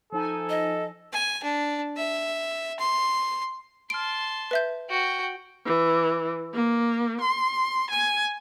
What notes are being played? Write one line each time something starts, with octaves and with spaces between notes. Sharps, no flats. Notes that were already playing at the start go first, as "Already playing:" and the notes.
F3 D#4 A4 G#5
D#5
G#5
D4
E5
C6
A5 C6 F6 D7
B4 E5 G6
F#4 G5
E3
A#3
C6
G#5